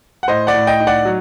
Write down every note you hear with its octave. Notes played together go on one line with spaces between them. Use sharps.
F#5
A2 C5 D#5
D5 F#5
A2
D#5 G5
D#4
D5 F#5
F#3